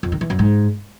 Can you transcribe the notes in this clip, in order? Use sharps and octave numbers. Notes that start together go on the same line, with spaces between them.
F2
D#3
E3
F#2
G#2